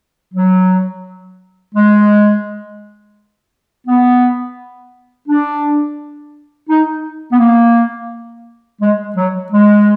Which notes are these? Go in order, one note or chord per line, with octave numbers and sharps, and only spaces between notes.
F#3
G#3
B3
D4
D#4
B3
A#3
G#3
F#3
G#3